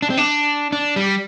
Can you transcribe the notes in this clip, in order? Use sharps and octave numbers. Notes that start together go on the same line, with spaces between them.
D4
C4
D4
D4
G3